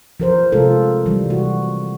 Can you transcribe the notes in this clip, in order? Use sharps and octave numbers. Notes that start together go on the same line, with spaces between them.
F3 A#4 C5
C3 G#3 A3 F4 A4 A#4
E3 F3 G3
C3 F#4